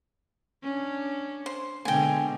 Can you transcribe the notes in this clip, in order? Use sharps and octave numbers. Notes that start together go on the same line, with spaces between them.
C#4 D4
C5
B2 D3 G#3 G5 G#5